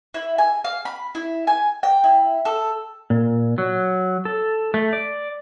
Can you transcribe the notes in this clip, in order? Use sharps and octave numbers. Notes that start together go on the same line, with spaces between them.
E4
G#5
F5
B5
E4
G#5
G5
E4
A4
A#2
F#3
A4
A3
D5